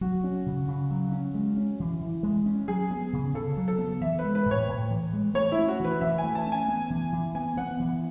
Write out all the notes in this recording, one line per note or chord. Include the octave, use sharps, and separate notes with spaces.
F#3 F#4
C#4
C#3
C#3
F#3
C#4
G#3
C#4
E3
E3
G#3
C#4
F#3 G#4
B3
C#3
C#3 A4
F#3
A4
B3
E3 E5
B4
G#3
B4
A2
C#5
A2
E3
G#3
A3 C#5
E4
C#4
F#4
E3 B4
E3 E5
G#5
A3
A5
C#4
G#5
B3
E3
E3
B3 G#5
B3 F#5
E3